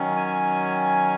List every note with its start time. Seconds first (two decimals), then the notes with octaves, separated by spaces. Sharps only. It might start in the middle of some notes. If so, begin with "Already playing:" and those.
Already playing: D#3 F#3 C#4
0.16 G#5